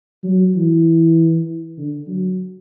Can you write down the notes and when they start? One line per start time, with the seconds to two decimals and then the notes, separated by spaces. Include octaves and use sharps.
0.24 F#3
0.55 E3
1.78 D3
2.07 F#3